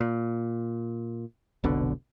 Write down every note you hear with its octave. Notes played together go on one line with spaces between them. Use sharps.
A#2
F1 B1 B2 D3